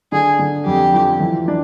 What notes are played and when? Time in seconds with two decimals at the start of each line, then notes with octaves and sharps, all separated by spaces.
0.12 D3 G#4
0.39 D3
0.66 F2 G4
0.94 F3
1.20 E3
1.48 D4